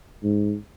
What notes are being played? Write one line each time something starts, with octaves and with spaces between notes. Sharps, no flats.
G#2